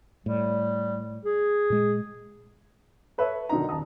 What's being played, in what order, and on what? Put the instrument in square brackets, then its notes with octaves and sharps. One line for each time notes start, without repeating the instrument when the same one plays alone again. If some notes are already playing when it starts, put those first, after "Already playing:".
[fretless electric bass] A2 [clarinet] G3
[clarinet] G#4
[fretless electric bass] A#2 G#3
[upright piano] A4 B4 C#5 E5
B1 D3 D#3 D#4 A#5
D#1 A5 A#5 D#6